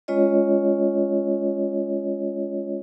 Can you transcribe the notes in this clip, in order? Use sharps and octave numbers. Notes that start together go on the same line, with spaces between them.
G#3 C#4 F4 C#5 D#5